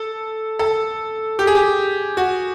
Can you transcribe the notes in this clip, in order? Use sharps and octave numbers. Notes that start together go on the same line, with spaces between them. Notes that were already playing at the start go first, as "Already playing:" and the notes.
Already playing: A4
A4
G4
G#4
G4
F#4